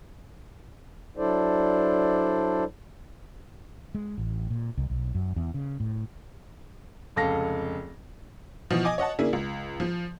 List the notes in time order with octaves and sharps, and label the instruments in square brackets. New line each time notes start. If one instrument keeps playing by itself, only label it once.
[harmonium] F#3 D4 E4 A4 C5 D5
[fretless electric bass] G#3
A1
A#2
C2
B1
F#2
E2
C#3
A2
[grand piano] F1 C#2 A4 F5 A#6
[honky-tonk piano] B2 E3 F3
D#5 G#5 D6
C#5 D#5 F#5 A5
C#3 A#3 D4 E4 G#4
C#2
F3